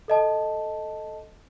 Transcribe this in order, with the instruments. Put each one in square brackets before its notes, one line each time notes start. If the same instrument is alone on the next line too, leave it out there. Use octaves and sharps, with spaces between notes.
[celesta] A4 D#5 A5